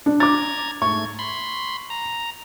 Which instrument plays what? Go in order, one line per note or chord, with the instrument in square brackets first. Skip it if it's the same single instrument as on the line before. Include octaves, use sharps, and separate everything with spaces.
[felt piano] D4
[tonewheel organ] A#5 G#6 [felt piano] D6 A6
[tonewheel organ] G#2 A3 G#6 [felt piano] C#6
[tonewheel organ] B5 C6
A#5